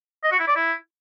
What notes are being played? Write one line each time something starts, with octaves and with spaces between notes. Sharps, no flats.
D#5
F#4
E4
D5
E4